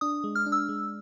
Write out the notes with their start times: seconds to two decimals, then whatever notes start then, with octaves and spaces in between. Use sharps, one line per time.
0.01 D4 D#6
0.24 G#3
0.35 F6
0.46 D4
0.52 E6
0.69 G#3